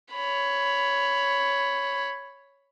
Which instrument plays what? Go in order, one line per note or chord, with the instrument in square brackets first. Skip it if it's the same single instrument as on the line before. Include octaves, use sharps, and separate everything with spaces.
[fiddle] C#5 B5